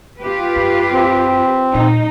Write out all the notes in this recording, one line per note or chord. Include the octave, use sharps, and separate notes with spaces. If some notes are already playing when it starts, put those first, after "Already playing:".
F4 G4 B4
F#2
C4
A#2 C#3 D#4